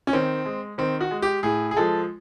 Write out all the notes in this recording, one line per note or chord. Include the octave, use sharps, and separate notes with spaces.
C#4
D#3 C4
G#3
D#3 C4
F#4
G#3
G4
A2 G#4
G#4
F3 G#3 A4